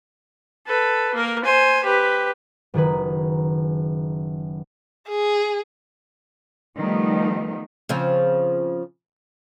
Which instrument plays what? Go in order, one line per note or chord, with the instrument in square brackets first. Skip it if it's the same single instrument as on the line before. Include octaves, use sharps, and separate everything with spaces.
[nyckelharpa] A4 B4
A#3 A#4
C5 G#5
G4 B4
[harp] F#1 D#3 G#4 B4
[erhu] G#4
[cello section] D#3 F3 G3 A3 B3
[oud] C#3 F3 C4